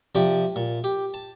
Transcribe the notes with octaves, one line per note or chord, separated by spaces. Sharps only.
C3 F3 G4 D5
A#2
G4
A5